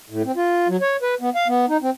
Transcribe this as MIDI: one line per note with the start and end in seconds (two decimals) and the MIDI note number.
0.10 0.22 45
0.25 0.32 60
0.36 0.68 65
0.68 0.77 54
0.81 0.97 73
1.02 1.15 71
1.21 1.30 59
1.35 1.47 77
1.48 1.66 59
1.69 1.77 63
1.82 1.90 60